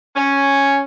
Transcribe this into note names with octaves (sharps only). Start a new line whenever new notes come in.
C#4